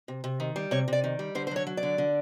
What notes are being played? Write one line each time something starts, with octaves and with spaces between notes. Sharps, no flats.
C3
C3
D#3
G3
C3 C#5
C3 D5
D#3
G3
D3 C5
C5
F#3 C#5
F#3
D5
D3
D3